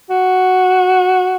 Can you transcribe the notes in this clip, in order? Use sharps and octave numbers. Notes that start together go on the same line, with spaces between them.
F#4